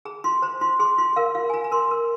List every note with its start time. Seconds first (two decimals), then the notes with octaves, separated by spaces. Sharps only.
0.05 G#4 A#5
0.24 F4 C6
0.42 C5 A#5
0.61 F4 C6
0.79 G#4 C6
0.98 F4 C6
1.16 A#4 F5
1.35 F4 F5
1.50 G#5
1.54 F4 A#5
1.64 A#5
1.72 A#4 C6
1.91 A#4